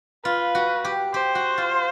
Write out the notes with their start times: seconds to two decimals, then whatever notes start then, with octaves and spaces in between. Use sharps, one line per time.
0.25 F4 B4
0.55 F#4
0.84 G4
1.14 G4 C5
1.35 F#4
1.58 F4